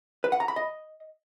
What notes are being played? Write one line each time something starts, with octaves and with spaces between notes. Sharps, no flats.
B4
F#5
A#5
B5
D#5